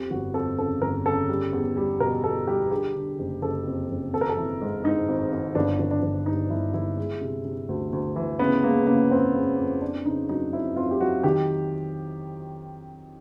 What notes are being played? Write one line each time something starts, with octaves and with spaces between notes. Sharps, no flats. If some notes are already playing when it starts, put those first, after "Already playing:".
Already playing: F2 G4
G1 F#4
F2 A4
C#3 A4
G1 A#4
C#3 A4
G3
E2
G3
B2 A#4
E2 A4
G3 G4
G#4
D3 G4
D3
F#1
F#1 A4
F2
F#1
G#1 A4
A#4
A4
E3
G#2
G#2 D#4
G#1
G#1
G1 D4
G1
D4
G1
G2 D#4
G1 E4
G1 E4
G#3
C3
C3
D2
D2
E3
C#3 B3
G#3 A#3
C#3 A#3
F2 C4
C#3
F2
F2 D4
C#3 D#4
F#3 D#4
F2 E4
F2 F4
G4
F#3 F#4
D#3 G4